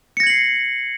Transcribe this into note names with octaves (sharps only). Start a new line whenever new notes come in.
G#6 A#6 C7 C#7 F#7